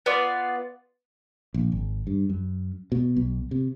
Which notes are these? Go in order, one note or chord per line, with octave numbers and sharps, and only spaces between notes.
B3 F4 B4 D5
A#1
G#1
G2
F#2
B2
B1
C3